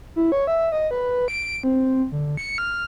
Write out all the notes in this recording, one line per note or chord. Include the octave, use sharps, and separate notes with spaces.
E4
C#5
E5
D#5
B4
D7
C4
D3
C#7
F6